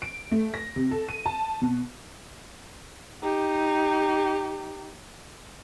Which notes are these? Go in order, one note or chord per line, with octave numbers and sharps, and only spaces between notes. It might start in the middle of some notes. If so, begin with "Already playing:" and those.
D7
A3
A#6
C3
A4
D#7
A5
B2
D#4 G4